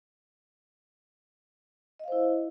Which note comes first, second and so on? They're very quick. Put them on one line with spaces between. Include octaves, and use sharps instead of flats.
D#5 F5 C5 E4